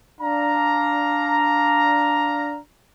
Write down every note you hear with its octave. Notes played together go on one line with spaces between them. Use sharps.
D4 F5 A#5